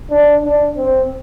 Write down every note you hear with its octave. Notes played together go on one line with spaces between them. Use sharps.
D4
D4
C4